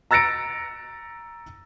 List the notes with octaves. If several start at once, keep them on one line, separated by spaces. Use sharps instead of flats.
A#5 E6 A6 A#6 C#7 D7